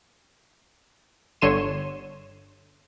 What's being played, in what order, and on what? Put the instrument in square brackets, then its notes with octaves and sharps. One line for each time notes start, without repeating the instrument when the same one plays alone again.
[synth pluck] G1 D3 C#5 C6 D#7 E7